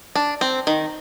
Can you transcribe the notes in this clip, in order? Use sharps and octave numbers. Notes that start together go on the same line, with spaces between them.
D4
C4
D#3